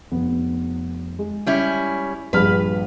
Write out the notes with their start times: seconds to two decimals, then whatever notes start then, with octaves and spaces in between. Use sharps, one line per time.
0.11 F1 B3
1.19 G#3
1.46 G3 C#4 E4
2.33 A#1 G2 B4 F6